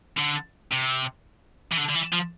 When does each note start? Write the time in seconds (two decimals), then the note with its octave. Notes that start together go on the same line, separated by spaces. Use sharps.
0.18 D3
0.72 C3
1.72 E3
1.77 D3
1.89 D3
1.94 E3
2.12 F3